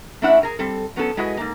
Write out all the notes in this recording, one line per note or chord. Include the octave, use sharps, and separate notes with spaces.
A3 C#4 D4 E4 E5 F#5
G#4 A#4
G3 C4 A4
F#3 B3 C#4 A4
G#3 E4 F#4 G#4 B4 D#5
G#2 A#3